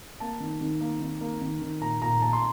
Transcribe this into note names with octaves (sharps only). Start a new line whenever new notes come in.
A#3 A5
D#3
D#3
A#3
D#3
A#3
D#3
D#3
A#2 A#5
A#2 A#5
A#2 A5
C6